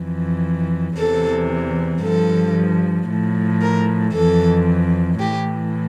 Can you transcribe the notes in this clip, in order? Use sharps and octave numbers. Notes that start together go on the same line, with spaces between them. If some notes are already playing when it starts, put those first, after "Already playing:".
Already playing: F2 E3
E2 C3 E3 A4
G2 F3 A4
A2 F3
A#4
F2 E3 A4
A2 E3 G4